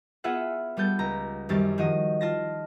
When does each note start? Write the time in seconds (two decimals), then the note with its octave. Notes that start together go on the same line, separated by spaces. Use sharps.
0.24 B3 F4 G#4 E5 F#5
0.77 G3 B3 A4 G6 A6
0.99 C#2 A#5
1.49 F#2 D#3 G3 C4 G4 A6
1.78 D#3 F3 F#4 D#5
2.21 F4 A5 A#6